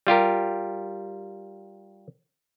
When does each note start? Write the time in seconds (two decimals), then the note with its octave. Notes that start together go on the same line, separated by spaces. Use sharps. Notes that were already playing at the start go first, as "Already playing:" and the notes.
0.07 G3 F4 G4 A#4